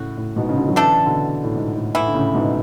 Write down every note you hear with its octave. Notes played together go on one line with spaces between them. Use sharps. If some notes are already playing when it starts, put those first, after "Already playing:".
Already playing: A2 C#3 F#4
A2
G#2 B2
C#3
B2 D3
F#3
C#3 E3 A3 D4 A4
B2 D3
A2
G#2
A2
A2 E3 B3 E4
D3
A2 C#3
G#2 B2